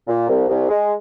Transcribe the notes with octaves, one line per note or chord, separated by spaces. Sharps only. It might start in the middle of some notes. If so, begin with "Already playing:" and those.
A#2
C2
C2
G#3